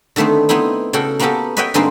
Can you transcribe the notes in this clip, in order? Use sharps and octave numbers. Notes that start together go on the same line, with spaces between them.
D3 D#3 A3 B3 C4
B3 C4 D#4 E4
C#3 F#4 A4 G5
A#3 B3 C#4 F#4 G4 A4
B4 C#5 D#5 E5 F#5 G5
G2 D3 G#3 A#3 C4 D#4